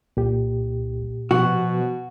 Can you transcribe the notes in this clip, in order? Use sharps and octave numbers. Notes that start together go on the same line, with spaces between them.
C2 A#2 G4
B2 F3 F#4